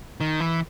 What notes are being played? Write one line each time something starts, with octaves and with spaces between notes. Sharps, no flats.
D#3
E3